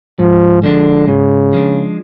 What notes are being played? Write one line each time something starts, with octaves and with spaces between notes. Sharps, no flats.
G#2 F3
D3 F3 G#3 D4
G#2 C#3
F3 G#3 D4